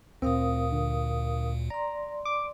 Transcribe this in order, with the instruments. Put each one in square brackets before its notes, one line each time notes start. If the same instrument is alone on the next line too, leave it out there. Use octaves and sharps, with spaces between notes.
[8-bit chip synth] D2 A#2 [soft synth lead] C4 [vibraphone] A#4 F5 D#6
[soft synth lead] D3
[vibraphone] D5 C6 [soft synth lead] A#5
[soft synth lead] D6